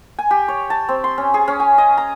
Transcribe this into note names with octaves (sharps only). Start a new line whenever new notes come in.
G#5
G4
C#5
A5
C4
C6
C#4
G#4
C#4
G#5
D#5
A#5